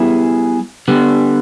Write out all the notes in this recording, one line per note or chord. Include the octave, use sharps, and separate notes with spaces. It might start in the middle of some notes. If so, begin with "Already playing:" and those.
Already playing: G3 B3 E4 G#4
D3 G3 B3